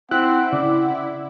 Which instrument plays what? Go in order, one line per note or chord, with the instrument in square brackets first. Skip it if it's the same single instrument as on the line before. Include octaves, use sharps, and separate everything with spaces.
[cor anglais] C4 [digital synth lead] E4 [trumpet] F#5 [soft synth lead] F#6
[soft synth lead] C#3 [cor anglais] D5